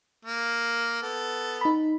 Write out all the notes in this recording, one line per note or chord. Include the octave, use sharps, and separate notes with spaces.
A#3
B3 A4
D#4 B5